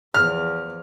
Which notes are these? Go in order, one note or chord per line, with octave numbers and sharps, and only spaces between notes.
E2 F3 F6